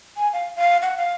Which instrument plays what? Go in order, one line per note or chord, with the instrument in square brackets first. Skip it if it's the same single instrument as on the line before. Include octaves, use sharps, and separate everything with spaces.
[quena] G#5
F5
F5
F#5
F5